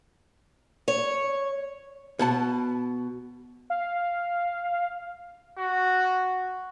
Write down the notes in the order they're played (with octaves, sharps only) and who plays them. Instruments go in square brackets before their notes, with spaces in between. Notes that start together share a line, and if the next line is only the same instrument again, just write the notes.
[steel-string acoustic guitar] C#5
[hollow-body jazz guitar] B2 F#5 A5
[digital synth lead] F5
[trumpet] F#4